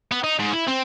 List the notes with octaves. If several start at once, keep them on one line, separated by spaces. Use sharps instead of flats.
B3
D#4
G#2
E4
C4